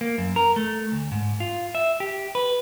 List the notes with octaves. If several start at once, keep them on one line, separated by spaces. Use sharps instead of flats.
A#3
F#2
A#4
A3
D2
G#2
F4
E5
G4
B4